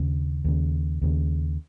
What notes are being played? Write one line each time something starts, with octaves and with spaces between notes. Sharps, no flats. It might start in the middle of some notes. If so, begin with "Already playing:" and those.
Already playing: D#2 C#3
D#2 C#3
D#2 C#3